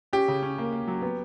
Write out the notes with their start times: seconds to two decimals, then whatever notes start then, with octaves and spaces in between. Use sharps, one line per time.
0.13 C#4 G4
0.28 C#3
0.43 C#4
0.58 A#3
0.73 A#3
0.87 F#3
1.02 B3